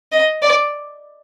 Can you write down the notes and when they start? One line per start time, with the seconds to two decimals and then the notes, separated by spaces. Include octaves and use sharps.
0.12 D#5
0.42 D5